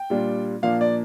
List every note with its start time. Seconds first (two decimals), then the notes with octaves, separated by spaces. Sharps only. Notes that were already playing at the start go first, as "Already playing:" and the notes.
Already playing: G5
0.10 A#2 G3 D4 F4
0.62 A#2 F3 A#3 D4 F5
0.81 D5